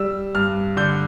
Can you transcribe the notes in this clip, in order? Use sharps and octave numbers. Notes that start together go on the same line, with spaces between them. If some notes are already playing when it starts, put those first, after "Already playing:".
Already playing: G3 E6
G2 F6
D3 G6